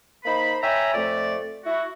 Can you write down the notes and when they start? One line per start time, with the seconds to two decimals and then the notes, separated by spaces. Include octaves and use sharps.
0.25 A#3 D#4 C5 B5
0.62 C#5 E5 G5 G#5 A#5 B5
0.94 F2 A3 D5
1.65 E4 F#4